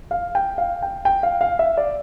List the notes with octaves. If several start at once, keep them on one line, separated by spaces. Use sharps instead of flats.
F5
G5
F5
G5
G5
F5
F5
E5
D5